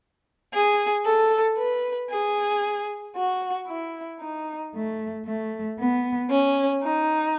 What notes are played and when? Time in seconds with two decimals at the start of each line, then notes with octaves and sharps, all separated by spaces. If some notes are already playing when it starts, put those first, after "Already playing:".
0.53 G#4
1.06 A4
1.59 B4
2.11 G#4
3.16 F#4
3.68 E4
4.20 D#4
4.73 A3
5.25 A3
5.78 B3
6.30 C#4
6.83 D#4